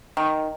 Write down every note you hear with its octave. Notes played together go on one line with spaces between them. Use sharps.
D#3